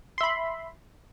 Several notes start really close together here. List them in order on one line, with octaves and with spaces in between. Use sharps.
C6 E5 B5